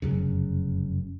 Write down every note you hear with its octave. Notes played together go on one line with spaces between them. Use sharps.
F1 F#2 C#3